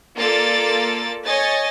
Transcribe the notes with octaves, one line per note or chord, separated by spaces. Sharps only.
A#3 F4 A4 D5 A6
C#5 D#5 G#5 A6